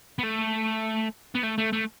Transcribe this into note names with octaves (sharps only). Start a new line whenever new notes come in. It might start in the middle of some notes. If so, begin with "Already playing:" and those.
B3
A3
B3
A3
A3
A3